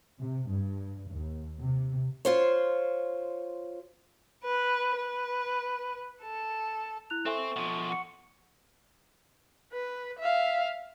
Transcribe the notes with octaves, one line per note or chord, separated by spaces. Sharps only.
C3
G2
D#2
C3
F4 C5 C#5
B4
B4
A4
E4 F#6 F7
C4 A4 C5 E5 G#5 C#6
B2 F3
F#5 C#7
B4
E5 F5